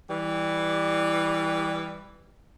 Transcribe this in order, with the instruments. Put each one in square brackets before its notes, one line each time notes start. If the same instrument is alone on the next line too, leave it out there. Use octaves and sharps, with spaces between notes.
[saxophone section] E3 G3